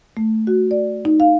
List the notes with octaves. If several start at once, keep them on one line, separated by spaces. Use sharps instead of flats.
A3
F#4
D5
D#4
F5